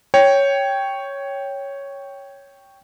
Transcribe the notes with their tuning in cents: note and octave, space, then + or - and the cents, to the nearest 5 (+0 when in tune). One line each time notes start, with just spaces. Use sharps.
C#5 +0 G5 +0